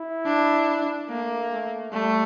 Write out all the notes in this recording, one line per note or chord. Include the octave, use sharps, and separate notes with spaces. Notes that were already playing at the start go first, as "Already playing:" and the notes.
Already playing: E4
D4
A3 A#3
A3
G3 A3